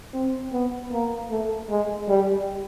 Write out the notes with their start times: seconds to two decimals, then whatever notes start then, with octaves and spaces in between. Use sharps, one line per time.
0.13 C4
0.53 B3
0.91 A#3
1.31 A3
1.70 G#3
2.09 G3